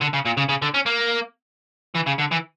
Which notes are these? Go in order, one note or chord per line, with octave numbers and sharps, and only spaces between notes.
D3
C#3
A#2
C#3
C#3
D3
C#4
A#3
E3
C#3
D3
E3